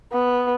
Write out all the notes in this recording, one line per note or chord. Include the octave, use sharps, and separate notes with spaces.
B3